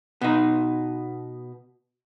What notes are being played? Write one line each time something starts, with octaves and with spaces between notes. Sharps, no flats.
B2 D#4